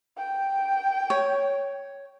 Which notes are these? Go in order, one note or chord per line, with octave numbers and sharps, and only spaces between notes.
G5
C#5